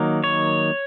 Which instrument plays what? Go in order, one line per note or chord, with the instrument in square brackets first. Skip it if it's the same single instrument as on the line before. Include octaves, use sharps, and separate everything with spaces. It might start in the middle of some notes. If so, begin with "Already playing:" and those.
Already playing: [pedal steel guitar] D#3 F#3 A#3 D#4
C#5